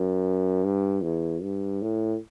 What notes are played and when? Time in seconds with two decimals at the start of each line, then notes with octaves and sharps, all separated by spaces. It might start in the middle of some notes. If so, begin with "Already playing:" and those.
Already playing: F#2
0.64 G2
1.03 E2
1.42 G2
1.82 A2